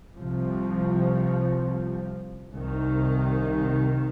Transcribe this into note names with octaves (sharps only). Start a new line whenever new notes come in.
C2 C3 F3
C2 C3 D#3